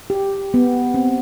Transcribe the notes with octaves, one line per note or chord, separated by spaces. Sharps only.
G4
B3
C4